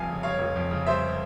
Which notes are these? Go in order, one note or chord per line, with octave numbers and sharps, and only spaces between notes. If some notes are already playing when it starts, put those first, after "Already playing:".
Already playing: F1 F2 G3 F5 G#5
C#3
G3 C#5 F5
F1
F2
C#3
G3 C5 E5